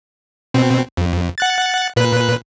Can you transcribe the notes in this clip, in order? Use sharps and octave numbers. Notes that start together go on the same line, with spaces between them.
B2 C4
F2
F#5 F#6 A6
A#2 B4 F#6